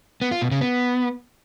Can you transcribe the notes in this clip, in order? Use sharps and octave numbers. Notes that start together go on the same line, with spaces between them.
B3
F4
B2
C#3
B3